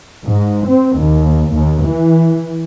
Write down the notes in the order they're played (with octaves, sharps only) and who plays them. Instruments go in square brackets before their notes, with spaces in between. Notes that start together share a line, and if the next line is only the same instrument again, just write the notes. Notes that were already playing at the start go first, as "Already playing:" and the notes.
[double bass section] G#2
C4
D#2
D#2
E3